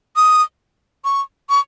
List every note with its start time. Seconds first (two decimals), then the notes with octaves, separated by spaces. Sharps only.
0.16 D#6
1.05 C#6
1.50 C#6